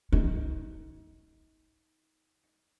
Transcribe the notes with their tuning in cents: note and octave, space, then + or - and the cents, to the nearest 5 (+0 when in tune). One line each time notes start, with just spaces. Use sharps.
D#4 +30